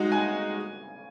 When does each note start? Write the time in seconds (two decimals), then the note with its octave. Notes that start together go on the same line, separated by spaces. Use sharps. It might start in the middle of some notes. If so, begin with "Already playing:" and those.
Already playing: G#3 D#4 F#4
0.12 G#5